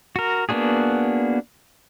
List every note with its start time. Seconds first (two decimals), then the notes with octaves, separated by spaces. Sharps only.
0.16 F#4 A#4
0.49 A#3 B3 D4 F#4 G#4